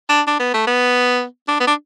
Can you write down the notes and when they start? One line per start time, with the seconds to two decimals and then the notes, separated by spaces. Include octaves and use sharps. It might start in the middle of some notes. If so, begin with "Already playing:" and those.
0.09 D4
0.27 D4
0.40 B3
0.54 A3
0.67 B3
1.48 D4
1.60 B3
1.67 D4